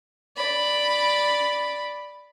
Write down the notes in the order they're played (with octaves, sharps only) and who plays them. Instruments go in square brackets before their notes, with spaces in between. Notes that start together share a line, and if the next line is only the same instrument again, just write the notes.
[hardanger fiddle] D5 B5